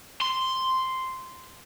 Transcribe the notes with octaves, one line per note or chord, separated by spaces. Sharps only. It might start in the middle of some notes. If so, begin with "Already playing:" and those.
C6